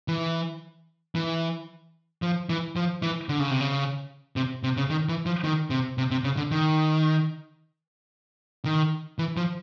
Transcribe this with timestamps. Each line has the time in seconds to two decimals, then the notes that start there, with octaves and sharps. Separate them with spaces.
0.08 E3
1.15 E3
2.22 F3
2.50 E3
2.76 F3
3.02 E3
3.29 D3
3.40 C#3
3.51 C3
3.61 C#3
4.36 C3
4.63 C3
4.77 C#3
4.90 D#3
5.09 E3
5.26 F3
5.44 D#3
5.70 C3
5.98 C3
6.11 C3
6.24 C#3
6.37 D3
6.51 D#3
8.65 D#3
9.19 E3
9.37 F3